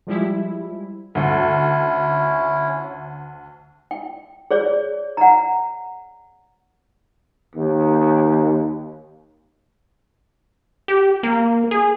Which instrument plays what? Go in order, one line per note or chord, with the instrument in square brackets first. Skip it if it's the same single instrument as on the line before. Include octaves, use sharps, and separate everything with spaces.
[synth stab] F3 G3 G#3 E4
[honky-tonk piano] D2 [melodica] C#4 E4
[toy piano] G5
G#4 C#5 D5
F#5 A#5
[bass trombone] D#2
[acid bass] G4
A#3
G#4